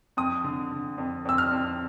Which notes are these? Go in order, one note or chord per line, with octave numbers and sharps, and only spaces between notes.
F2 D#6
D3
D3
F2
F2 E6
F6
F2